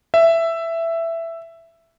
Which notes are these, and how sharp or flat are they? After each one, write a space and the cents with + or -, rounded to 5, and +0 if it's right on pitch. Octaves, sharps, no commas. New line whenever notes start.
E5 +10